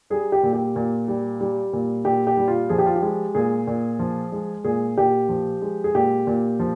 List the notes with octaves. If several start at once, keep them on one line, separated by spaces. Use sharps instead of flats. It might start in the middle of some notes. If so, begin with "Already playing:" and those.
G3 G#4
G4
A#2
G4
A#2
G3
G3
A#2
A#2 G4
G4
G3
F4
F3 G#4
G4
F4
G4
G#3
A#2 G#4
A#2
F3
G#3
A#2 G#4
A#2 G4
F3
G#3
G#4
A#2 G4
A#2
F3